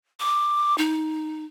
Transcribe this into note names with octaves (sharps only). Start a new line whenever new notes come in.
D6
D#4